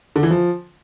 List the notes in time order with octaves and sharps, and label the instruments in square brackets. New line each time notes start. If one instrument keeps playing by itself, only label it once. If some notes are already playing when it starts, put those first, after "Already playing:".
[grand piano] D3
E3
F3